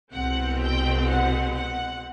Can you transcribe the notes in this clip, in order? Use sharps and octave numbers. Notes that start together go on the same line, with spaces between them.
C2 B2 G#3 C4 F#5
G5
F#5
F#5